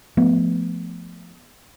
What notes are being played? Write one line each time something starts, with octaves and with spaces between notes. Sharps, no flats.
F3 A3 B3